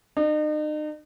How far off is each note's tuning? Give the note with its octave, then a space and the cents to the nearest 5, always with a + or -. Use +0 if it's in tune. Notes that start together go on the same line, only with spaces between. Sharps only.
D#4 -40